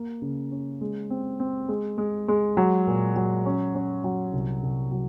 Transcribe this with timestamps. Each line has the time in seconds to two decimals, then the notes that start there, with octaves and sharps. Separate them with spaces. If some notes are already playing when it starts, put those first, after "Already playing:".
Already playing: A#3
0.22 C#3
0.51 C#4
0.81 G#3
1.10 C4
1.40 C4
1.69 G#3
1.98 G#3
2.28 G#3
2.57 F#3
2.87 A#2
3.16 F#3
3.46 C#4
3.75 C#4
4.04 F#3
4.33 C2
4.63 C2
4.92 F#3